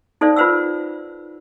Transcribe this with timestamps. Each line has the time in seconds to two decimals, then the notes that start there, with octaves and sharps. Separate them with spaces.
0.21 D#4 A4 C5 D5 F5
0.36 F4 B4 C5 F#5 E6